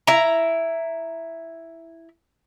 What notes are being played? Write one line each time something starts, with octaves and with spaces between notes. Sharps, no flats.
E4 A#5